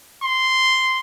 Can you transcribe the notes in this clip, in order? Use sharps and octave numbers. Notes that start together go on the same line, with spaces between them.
C6